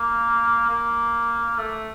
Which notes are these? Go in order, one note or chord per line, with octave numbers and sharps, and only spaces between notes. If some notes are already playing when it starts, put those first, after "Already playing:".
Already playing: A#3
A#3
A3